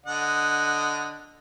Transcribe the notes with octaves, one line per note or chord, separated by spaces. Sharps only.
D3 D#5 F#5